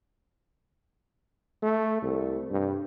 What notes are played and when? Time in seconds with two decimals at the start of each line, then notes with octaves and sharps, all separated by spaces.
1.63 A3
2.02 C2
2.50 G2